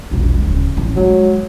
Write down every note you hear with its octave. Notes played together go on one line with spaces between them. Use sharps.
E1 A#1
D1 C#3
A1
F#3 G#3